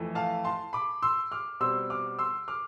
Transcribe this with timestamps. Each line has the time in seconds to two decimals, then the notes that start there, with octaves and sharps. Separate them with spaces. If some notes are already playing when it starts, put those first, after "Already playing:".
Already playing: F2 E3 A3
0.15 F5 A5
0.44 A5 C6
0.73 B5 D6
1.02 C6 E6
1.32 D6 F6
1.60 B2 G3 C4 C6 E6
1.90 D6 F6
2.19 C6 E6
2.48 D6 F6